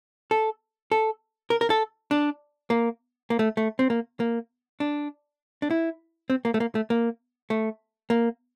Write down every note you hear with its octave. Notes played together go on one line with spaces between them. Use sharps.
A4
A4
A#4
A#4
A4
D4
A#3
A#3
A3
A3
C4
A#3
A#3
D4
D4
E4
C4
A#3
A3
A#3
A3
A#3
A3
A#3